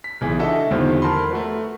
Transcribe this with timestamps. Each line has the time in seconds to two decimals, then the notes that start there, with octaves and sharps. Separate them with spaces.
0.04 B6
0.21 B1 E3 G#4
0.39 D4 F#4 A4 D#5 E5
0.71 E2 D3 D#3 F3 G3 C4
1.02 A#4 A5 B5 C6
1.31 A3 F#4 B4